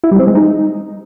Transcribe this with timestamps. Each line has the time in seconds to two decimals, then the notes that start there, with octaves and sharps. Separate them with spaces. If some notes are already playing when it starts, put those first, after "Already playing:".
0.04 E4
0.11 G3
0.19 C4
0.27 G#3
0.35 D#4